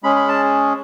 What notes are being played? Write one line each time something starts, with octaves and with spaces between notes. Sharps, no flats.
G#3 C#4 G#4 B5
B5
A5